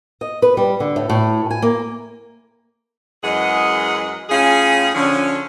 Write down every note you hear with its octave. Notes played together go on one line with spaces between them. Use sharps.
D#5
B4
G3
D3
A2
A2
G#5
A#3
F#2 E3 G#3 G#4 D#5 F#5
A2 C#4 F4 G#4
D3 F3 C#4